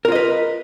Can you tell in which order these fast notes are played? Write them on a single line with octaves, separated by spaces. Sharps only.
A#4 F4 D#5 B4